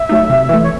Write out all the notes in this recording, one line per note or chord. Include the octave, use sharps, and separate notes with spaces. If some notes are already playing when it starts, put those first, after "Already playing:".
Already playing: E5
F#3 A3 D#4
C3
E3 A3
C#5